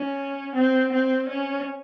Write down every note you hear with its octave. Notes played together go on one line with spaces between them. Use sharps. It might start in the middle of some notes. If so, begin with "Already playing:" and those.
Already playing: C#4
C4
C4
C#4